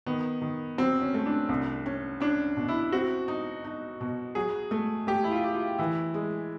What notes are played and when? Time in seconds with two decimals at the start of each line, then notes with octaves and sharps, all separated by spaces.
0.06 D#3 B3
0.42 D#3
0.78 F#3 C4
1.02 C#4
1.14 A3
1.26 D4
1.49 C2
1.86 C#4
2.20 C#4 D4
2.57 B2
2.68 E4
2.92 C4 F#4
3.28 D#4
3.64 D#4
4.01 B2
4.35 F#3 G#4
4.71 A3
5.07 A3 G4
5.24 E4
5.31 F4
5.43 G4
5.55 F4
5.78 E3 E4
6.14 G#3